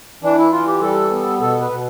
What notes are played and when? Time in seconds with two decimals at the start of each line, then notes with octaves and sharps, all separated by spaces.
0.23 E3 D4
0.38 E4
0.52 E3 F4
0.67 G4
0.81 G3 A4
1.11 B3
1.41 B2 A4
1.61 B4
1.70 B2